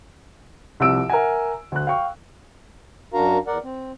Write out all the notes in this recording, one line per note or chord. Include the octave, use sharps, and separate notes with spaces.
C2 C3 F3 E6 D7
A#4 E5 F#5 G#5
D2 F#6
F5 G5 C#6
F#2 D4 F#4 A#4 F5 A#5
E2 A#4 D5 F#5
C4